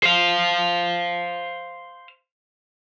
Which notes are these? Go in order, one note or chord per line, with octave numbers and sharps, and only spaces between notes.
C5 F5